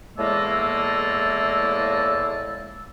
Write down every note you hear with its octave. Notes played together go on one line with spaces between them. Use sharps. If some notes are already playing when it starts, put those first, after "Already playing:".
E2 A2 G#3 A#3 A5 E6